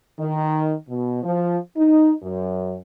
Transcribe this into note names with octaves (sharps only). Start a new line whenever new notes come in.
D#3
B2
F3
D#4
F#2